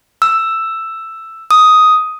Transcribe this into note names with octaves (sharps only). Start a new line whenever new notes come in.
E6
D#6